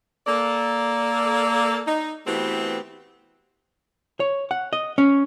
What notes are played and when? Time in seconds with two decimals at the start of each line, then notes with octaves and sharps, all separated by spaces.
0.27 A#3 A4 D5
1.86 D#4
2.27 E3 A3 B3 C4 F#4 G4
4.20 C#5
4.51 F#5
4.73 D#5
4.98 C#4